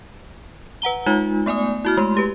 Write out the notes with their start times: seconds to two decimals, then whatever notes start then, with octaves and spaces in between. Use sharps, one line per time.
0.82 B4 F#5 A#5 G7
1.06 G#3 D#4 F4
1.46 A3 B3 D5 G#5 D#6
1.85 E4 F#4 F6
1.97 G#3 A3 C6
2.17 G4 B4